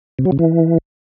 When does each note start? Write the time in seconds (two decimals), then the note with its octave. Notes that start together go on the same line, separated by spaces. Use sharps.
0.19 C3
0.25 F#3
0.32 C#3
0.39 E3